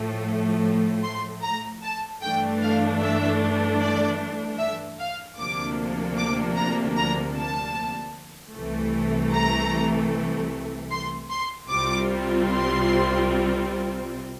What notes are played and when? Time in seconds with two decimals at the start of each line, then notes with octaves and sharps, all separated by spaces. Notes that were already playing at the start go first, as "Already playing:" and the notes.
Already playing: A2 F3 A3
1.04 C6
1.43 A#5
1.82 A5
2.22 G2 E3 A3 D4 G5
2.62 F5
3.01 E5
3.80 D5
4.58 E5
4.99 F5
5.38 D2 C3 F3 A#3 D4 D6
6.17 D6
6.57 A#5
6.96 A#5
7.36 A5
8.54 C2 C3 E3 A3
9.33 A#5
10.90 C6
11.30 C6
11.69 C2 C3 G3 C4 F4 D6
12.48 C6